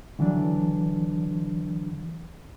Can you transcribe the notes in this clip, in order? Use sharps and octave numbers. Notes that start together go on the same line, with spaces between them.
D3 E3 F#3 D4